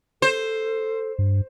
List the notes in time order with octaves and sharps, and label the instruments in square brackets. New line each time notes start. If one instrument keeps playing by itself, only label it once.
[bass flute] A4 [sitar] C5
[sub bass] G2